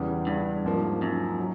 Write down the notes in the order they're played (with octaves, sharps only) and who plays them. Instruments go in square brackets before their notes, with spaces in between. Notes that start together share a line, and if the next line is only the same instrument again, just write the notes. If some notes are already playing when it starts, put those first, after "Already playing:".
Already playing: [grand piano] E2 C#3 E3 G3
[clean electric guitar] G2
[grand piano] G#2 F3 A#3
[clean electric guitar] F#2
[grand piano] F#3